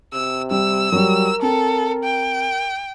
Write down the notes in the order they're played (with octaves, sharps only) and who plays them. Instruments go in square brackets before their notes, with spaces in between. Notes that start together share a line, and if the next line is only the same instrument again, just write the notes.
[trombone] C3 [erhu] E6
[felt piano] G3 [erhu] E6
[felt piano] F#3 G3 [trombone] A#4
[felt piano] C4 [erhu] A4
[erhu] G5